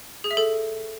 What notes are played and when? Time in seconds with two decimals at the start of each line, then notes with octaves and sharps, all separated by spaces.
0.24 G#4
0.31 E5
0.37 A4